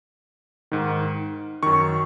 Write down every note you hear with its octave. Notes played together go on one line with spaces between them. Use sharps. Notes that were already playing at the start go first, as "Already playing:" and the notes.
G#2 D#3
F#2 D#3 C#6